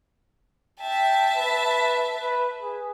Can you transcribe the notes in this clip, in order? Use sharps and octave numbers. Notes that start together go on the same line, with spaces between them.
E5 G5 A5
B4
B4
G#4